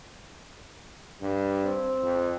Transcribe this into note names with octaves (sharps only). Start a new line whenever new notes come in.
G2
C4
F2